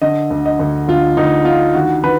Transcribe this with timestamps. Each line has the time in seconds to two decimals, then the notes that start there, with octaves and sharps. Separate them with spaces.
0.02 D3 D#5
0.30 D2
0.46 D#5
0.59 D2
0.88 D2 F4
1.17 D2 D#4
1.45 D3 F4
1.75 D#3 F#4
2.03 D#3 B4